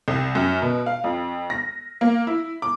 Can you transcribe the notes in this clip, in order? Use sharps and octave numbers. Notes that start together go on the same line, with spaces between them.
C2
F#2
B2
F5
F2
A#6
A#3
E4
D6